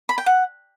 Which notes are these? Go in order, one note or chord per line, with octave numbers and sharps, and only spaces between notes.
B5
G5
F#5